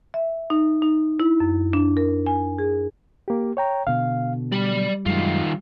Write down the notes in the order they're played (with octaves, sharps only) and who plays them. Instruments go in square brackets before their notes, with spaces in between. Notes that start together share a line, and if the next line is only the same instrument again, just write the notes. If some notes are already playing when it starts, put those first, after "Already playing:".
[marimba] E5
D#4
D#4
E4
F#2
D4
A#4
G#5
G#4
[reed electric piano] A#3 G4
C#5 G5 A#5
[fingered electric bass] B2 D3 [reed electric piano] F5
[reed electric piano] G3 [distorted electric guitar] D5 B5
[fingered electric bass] F#2 F#3 G#3 [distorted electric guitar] D#3 F4